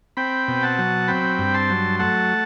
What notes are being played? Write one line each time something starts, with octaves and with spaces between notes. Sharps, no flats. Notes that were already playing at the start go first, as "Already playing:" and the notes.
C4 G5 B5
B2
F#5 A5
F#3
C4 G5 B5
G2
A5 C6
F#3
A3 F#5 A5